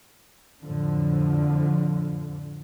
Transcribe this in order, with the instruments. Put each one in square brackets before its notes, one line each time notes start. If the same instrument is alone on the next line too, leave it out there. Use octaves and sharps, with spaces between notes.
[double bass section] F2 A2 D3 F3